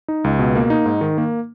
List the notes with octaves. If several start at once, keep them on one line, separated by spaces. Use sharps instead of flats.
D#4
C#2
B2
A#3
D#4
G#2
D#3
A#3